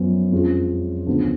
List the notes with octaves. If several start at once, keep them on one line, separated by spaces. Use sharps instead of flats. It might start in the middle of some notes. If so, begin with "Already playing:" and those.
Already playing: F#2 F3 B3
F2 F3 G#3 C#4 F4
D2 C#3 F3 B3